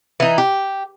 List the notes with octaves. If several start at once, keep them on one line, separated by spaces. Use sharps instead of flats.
E3 D#4
G4